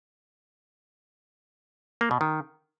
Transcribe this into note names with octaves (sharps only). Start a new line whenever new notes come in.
A#3
B2
D#3